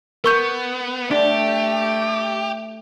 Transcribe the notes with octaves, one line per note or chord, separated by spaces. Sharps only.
B3 A#4 C#6 G6
A3 D4 G4